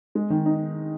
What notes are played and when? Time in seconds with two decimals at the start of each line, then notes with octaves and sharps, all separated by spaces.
0.15 G#3
0.30 D#3
0.45 D#4